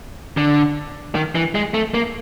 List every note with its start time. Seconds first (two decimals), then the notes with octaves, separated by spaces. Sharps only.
0.37 D3
1.15 D#3
1.35 E3
1.55 G#3
1.74 A3
1.94 A#3